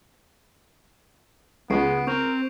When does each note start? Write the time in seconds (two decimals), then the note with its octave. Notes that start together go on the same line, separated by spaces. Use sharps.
1.70 C#2 G#3 B3 C#6 C7 D7
2.07 C4 A#4 C#6 G6 F7